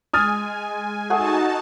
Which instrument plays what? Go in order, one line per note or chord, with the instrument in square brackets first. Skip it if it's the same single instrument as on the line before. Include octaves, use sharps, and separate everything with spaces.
[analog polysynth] G#3 G#5 [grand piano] D#6 F6 A6
[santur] A3 G#4 F#5 [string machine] D#4 F#4 A5